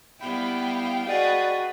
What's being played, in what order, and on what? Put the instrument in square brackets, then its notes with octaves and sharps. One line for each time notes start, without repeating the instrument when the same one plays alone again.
[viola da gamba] G3 B3 E4 [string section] F5 G5 [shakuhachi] B5
[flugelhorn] F#4 [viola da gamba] G#4 B4 D#5 [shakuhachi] D5